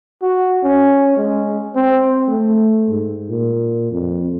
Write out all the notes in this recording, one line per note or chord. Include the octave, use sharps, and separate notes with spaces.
F#4
C#4
G#3
C4
A3
G#2
A#2
F2